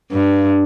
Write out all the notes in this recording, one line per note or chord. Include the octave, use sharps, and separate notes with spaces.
G2